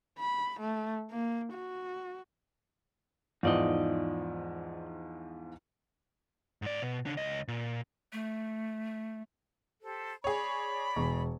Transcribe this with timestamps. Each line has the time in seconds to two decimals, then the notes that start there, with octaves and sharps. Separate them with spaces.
0.19 B5
0.60 A3
1.11 A#3
1.53 F#4
3.43 E2 G#2 F3 D#4 D5 D#5
6.62 G#2 D5
6.82 B2
7.06 C#3 D4
7.17 C#2 D#5
7.48 A#2
8.12 A3
9.83 G4 A4 C5
10.24 G#4 C#5 D5 B5
10.96 E1 C#6